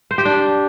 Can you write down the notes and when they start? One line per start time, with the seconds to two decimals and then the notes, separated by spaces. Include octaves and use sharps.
0.11 C5
0.18 G4
0.25 D4